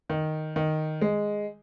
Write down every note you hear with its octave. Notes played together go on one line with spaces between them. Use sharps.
D#3
D#3
G#3